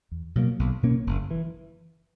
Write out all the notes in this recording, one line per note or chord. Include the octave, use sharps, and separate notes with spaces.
E2
B2 F#3 A#3
B1
B2 A#3 C#4
F#1
E3